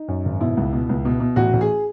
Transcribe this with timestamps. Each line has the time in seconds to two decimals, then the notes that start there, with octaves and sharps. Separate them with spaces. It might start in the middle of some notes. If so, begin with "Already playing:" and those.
Already playing: D#4
0.08 F#2
0.25 G#1
0.41 B2 E4
0.57 C#2
0.73 B2
0.89 C#2
1.05 B2
1.20 B2
1.36 A1 F#4
1.53 A1
1.61 G#4